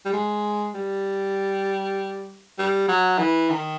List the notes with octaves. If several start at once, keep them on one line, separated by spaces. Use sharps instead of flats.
G3
G#3
G3
G3
F#3
E3
D#3